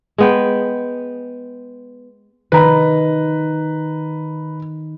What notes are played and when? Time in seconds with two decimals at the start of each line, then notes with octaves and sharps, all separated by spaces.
0.18 G#3 B3 G5
2.52 D#3 B4 A#5 B5